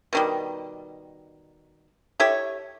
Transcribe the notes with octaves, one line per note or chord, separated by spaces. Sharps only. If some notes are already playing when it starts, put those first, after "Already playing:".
B2 D#3 G3
E4 G4 A4 C#5